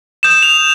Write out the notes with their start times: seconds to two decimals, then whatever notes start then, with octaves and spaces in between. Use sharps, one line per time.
0.23 D#6 G6 E7
0.43 F7